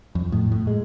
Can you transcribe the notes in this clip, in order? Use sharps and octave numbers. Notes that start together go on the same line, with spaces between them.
F2
A2
A2
G#3